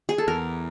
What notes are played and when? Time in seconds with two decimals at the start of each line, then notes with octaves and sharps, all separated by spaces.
0.09 G#4
0.18 A4
0.28 E2 A#4